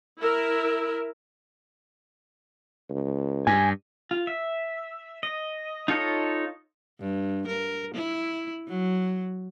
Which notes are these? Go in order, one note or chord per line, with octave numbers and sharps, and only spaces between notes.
E4 A#4 E5
C#2
G2 G#5
F4
E5
D#5
D#4 F4 A4 C#5 D#5
G2
A#4
E4
F#3